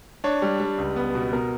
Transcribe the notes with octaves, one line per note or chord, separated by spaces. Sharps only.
D4 C#5
G3
G3
C#2
B3
B2
B2 A#4